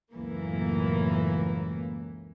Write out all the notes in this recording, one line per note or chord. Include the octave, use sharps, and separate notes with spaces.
C#2 F#2 A2 E3 A#3